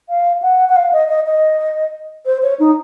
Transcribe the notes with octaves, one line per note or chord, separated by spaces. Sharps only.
F5
F#5
F#5
F5
D#5
D#5
D#5
C5
C#5
D#4